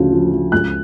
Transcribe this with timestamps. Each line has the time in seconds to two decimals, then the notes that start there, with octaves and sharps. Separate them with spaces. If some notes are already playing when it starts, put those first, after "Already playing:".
Already playing: D2 C#3 F3
0.12 F3
0.32 F3
0.52 C#2 F#6